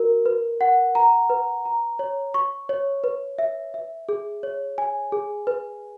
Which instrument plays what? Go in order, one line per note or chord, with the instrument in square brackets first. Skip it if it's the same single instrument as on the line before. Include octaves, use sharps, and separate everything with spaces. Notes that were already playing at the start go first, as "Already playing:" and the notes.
Already playing: [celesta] F#4 A#4
B4
F#5
A#5
B4
A#5
C#5
C#6
C#5
B4
E5
E5
G#4
C#5
G#5
G#4
B4